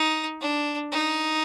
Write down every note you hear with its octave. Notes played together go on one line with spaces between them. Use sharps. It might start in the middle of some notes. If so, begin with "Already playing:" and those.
Already playing: D#4
D4
D#4